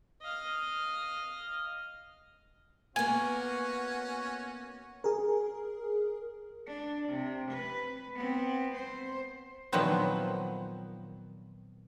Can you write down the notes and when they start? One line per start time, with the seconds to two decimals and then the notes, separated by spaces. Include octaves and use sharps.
0.22 D#5 F5
2.96 A#3 B3 C#4 F#4 G#5
5.04 G#4 A#4
6.67 D4
7.08 C3
7.51 B4
8.15 B3 C4
8.75 C5
9.72 A#2 D#3 F3 F#3 B3 C4